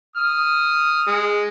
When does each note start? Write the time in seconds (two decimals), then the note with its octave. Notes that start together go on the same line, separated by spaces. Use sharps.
0.16 D#6 F6
1.07 G#3